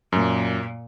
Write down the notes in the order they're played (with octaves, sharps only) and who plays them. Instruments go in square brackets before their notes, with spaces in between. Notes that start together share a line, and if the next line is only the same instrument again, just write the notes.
[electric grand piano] F#2 [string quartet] A#2